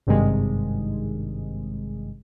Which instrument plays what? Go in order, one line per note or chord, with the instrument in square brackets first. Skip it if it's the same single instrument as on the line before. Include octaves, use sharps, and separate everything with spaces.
[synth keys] G#1 G2 C3 D#3 G#3